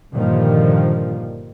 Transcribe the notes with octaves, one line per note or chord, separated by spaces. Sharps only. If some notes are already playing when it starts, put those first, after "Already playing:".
G2 A#2 D3 D#3 F3